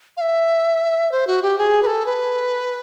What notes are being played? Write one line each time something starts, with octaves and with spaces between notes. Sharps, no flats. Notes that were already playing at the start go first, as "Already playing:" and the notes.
F5
E5
C5
F#4
G4
G#4
B4
A4
B4